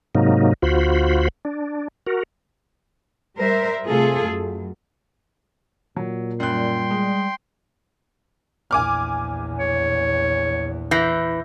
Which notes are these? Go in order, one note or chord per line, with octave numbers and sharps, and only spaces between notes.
G#2 C3 F#3 A#3 D#4
D2 F4 F#4 C5 B5
D4
F#4 A#4
G3 A#4 C5 E5
C3 A3 F4 G#4 A4
F#2
A#2 F#3
F#2 G3 G5 C6 F#6
G#3
A#1 E2 G#5 D6 F6
C#5
E3 G6 A#6 C7